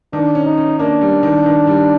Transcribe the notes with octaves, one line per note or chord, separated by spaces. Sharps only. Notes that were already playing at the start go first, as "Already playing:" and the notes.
D#3 D4
C#4
D#4
C#4
A#3 D4
G3
D#3
D#3
G3